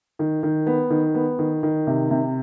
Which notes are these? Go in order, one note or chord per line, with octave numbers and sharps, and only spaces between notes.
D#3
D#3
B3
D#3
B3
D#3
D#3
C3
C3